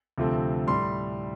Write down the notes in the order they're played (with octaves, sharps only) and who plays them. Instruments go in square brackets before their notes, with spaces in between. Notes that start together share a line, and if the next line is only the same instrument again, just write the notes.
[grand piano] D2 C3 F3 A3 C4
A2 G3 C6